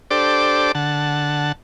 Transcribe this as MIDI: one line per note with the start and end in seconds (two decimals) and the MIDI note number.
0.11 0.72 62
0.11 0.72 67
0.11 0.72 69
0.11 0.72 72
0.11 0.72 74
0.11 0.72 86
0.75 1.52 50
0.75 1.52 78
0.75 1.52 81